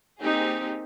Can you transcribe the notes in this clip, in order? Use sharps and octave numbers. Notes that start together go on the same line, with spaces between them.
A#3 C4 D#4 G4 G#4